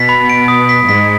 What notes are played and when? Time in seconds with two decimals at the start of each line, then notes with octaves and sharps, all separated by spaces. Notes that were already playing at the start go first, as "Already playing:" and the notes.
Already playing: B2 B3 B6
0.09 B5
0.29 D7
0.48 D#6
0.69 B6
0.88 G#2 G#3 B6